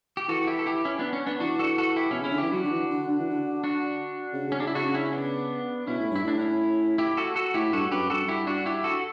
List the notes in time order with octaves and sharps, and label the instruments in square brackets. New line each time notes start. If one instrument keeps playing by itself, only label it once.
[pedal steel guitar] G4
[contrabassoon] E3 [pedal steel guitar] F#4 A4
[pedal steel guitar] E4 G4
A4
E4 G4
C#4 E4
B3 D4
C#4
B3 D4
[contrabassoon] E3 [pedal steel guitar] D4 F#4
[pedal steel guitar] F#4 A4
F#4 A4
E4 G4
[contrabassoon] B2 [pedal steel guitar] C#4 E4
[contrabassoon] C#3 [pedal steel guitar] C#4 E4
[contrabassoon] D3
[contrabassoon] E3 [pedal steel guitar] E4 G4
[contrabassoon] F#3 [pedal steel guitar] D4 F#4
[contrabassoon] D3
E3
D3
D3
E3
D3
[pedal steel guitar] D4 F#4
[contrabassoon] C#3
[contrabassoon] C#3 [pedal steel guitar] C#4
[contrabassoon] C#3 [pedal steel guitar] D4
[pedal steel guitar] E4
[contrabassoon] C#3 [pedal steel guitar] D4 F#4
[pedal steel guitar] C#4 E4
B3 D4
[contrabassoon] B2 [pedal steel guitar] C#4 E4
[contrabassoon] A2
[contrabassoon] G2 [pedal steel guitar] E4
[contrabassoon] A2 [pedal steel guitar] D4
[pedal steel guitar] C#4 E4
E4 G4
F#4 A4
F#4 A4
[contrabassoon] A2 [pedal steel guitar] E4 G4
[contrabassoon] G2 [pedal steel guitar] F#4 A4
[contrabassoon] F#2 [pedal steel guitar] G4 B4
[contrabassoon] G2 [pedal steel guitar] F#4 A4
[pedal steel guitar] E4 G4
D4 F#4
E4 G4
F#4 A4